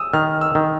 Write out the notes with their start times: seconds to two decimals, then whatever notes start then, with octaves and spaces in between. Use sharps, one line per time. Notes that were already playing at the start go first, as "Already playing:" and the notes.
Already playing: D#6 E6
0.13 D#3 F6
0.41 E6
0.55 D#3